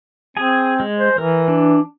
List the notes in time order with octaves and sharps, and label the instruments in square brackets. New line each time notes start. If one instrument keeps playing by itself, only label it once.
[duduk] C4 [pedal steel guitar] G#4 G#5
[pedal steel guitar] G#3
[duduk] C5
[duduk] E3 [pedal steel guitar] A#4
[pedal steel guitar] D4